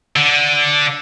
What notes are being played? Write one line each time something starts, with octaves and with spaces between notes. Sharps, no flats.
D3